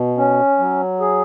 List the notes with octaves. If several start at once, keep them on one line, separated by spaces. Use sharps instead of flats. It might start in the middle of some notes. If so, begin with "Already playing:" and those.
Already playing: B2
C#4
F#3
G#4